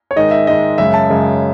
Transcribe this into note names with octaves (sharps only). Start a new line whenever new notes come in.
C#5
G#2 D#3 G#3 D#5
E5
G#2 D#3 G#3 D#5
F#2 C#3 G#3 E5
A5
F#2 C#3 G#3